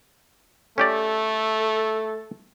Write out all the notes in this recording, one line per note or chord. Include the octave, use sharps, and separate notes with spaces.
A3 C#4 G4 A4 D5